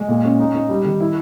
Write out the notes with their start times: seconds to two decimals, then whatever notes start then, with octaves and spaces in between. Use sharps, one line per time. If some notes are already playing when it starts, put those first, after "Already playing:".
Already playing: G#3
0.08 A#2
0.24 C#4
0.39 D#4
0.54 D#4
0.69 G3
0.84 D#3
1.00 E4